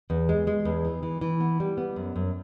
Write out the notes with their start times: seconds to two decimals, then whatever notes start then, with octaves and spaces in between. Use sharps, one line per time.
0.10 E2
0.29 G#3
0.47 G#3
0.65 E2
0.85 E3
1.03 E3
1.21 E3
1.40 B3
1.60 G3
1.78 B3
1.96 F#2
2.16 F#2